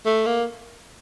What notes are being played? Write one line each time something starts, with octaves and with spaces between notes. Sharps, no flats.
A3
A#3